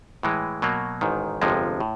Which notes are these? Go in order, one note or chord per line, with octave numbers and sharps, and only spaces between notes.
A2 E3 G#3
B2 F#3 A#3
A1 G#2 D#3
G1 F2 C3 F3 G#3
A2